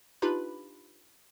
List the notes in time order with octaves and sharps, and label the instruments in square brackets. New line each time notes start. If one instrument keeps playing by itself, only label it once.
[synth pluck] D4 D#4 F4 G4 B4 B5